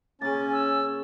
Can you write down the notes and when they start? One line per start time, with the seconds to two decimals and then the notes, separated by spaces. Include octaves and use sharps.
0.21 C#3 A#3 C#4 G#5 A6
0.53 E6